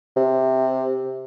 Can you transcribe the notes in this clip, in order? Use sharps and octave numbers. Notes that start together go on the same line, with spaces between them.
C3